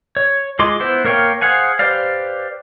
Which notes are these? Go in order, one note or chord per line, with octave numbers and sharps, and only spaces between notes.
C#5
G#3 F4 G#4 C6 D6
B3 E4 C5
A#3 A#4 C#5 F5 G5
G#4 C5 F5 F#5 G#5
G4 B4 C5 D5 F5